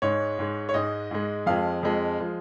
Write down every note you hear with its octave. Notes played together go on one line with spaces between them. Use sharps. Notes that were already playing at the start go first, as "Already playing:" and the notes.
G#2 G#3 C#5
G#2 G#3
C#5
G#2 G#3 D#5
G#2 G#3
F2 F3 G#3 F5
F2 F3 G#3
F3 G#3